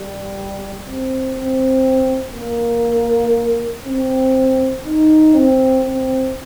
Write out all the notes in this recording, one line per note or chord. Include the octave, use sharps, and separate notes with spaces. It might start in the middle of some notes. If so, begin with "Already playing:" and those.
Already playing: G3
C4
C4
A#3
C4
D#4
C4
C4